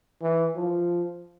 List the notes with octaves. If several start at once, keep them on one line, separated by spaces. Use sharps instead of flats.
E3
F3